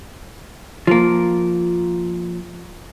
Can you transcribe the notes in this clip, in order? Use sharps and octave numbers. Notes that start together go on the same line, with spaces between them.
F3 A#3